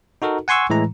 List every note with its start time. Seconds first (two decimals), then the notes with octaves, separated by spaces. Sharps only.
0.22 D#4 F#4 A4 A#4
0.48 F#5 G#5 C6 C#6 E6
0.70 A2 E3 G#3 A#5